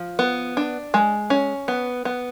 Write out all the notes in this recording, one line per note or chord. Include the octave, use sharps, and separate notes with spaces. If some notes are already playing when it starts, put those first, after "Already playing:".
Already playing: F3
B3
D4
G#3
C#4
B3
B3